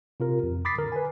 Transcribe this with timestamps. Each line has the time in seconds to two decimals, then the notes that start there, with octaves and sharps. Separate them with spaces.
0.20 C3 F4 A#4
0.43 F2
0.65 B5 D6 D#6 A6 B6 C7
0.78 D3 A#4
0.92 B4 G#5